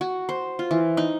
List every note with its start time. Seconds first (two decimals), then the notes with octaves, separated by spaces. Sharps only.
0.01 F#4
0.29 C5
0.59 F4
0.71 E3
0.97 D#4